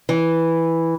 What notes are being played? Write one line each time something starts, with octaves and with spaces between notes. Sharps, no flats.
E3